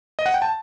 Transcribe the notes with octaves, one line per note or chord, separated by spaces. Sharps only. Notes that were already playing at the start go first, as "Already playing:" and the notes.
D#5
F#5
G5
A5